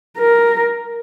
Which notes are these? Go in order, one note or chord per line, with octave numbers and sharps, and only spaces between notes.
A#4